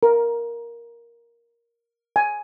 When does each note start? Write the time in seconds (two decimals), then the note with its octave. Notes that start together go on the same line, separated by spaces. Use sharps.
0.03 A#4
2.16 G#5